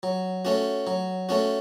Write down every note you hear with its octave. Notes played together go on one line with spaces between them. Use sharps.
F#3
A3 C#4 F#4
F#3
A3 C#4 F#4